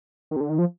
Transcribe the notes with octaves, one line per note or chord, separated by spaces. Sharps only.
D#3
C3
D3
D#3
F3